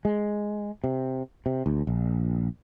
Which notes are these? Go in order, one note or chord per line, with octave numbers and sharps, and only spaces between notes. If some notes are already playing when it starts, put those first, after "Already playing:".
G#3
C3
C3
D2
A#1